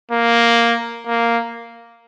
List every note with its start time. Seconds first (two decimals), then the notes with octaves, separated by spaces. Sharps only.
0.11 A#3
1.07 A#3